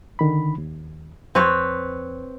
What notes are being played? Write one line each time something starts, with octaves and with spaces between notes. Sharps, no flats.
D3 D#3 B5
D#2
F2 C4 B4 C#5